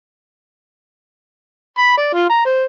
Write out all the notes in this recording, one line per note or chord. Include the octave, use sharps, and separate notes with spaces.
B5
D5
F4
A#5
C5